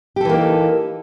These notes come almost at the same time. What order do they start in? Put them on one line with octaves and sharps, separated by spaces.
G4 A4 E3 A#3 D#4